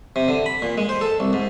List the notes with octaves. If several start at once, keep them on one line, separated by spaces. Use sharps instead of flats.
C3
D3
B5
A#2
G#3
C5
A4
C2
G#2